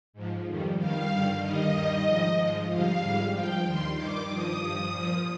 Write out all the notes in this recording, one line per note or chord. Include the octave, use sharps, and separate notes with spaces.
G#2 F3
F2 D#3 G3
G2 D#3 G3 F5
G2 D3 G3
D#2 D#3 G3 D#5
G2 D#3 G3
G#2 F3
G#2 F3
F2 D3 G3 F5
G#2 G3
G2 F3 G5
D#2 D#3 G3 C6
G2 D#3 G3 D6
G2 F3 D#6
G2 F3
A#2 F3